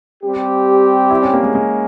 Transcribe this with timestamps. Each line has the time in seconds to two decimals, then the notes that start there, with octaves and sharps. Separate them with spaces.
0.22 G3 C4 G4
1.10 E4
1.22 C#4
1.33 A#3
1.43 G#3
1.55 G#3